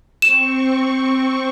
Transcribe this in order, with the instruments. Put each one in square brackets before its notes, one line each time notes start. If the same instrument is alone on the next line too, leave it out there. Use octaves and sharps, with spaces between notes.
[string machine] C4 C#6 [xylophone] E7